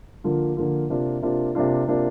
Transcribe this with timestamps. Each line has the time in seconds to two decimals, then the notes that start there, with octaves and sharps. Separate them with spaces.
0.24 D3 F3 A#3 F4
0.57 D3 F3 A#3 F4
0.90 C3 A#3 D4 F4
1.22 C3 A#3 D4 F4
1.55 C3 A#3 D4 F4
1.87 C3 A#3 D4 F4